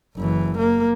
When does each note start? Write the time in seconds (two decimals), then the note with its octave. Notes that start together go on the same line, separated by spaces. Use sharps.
0.16 F#1 E3
0.58 A#3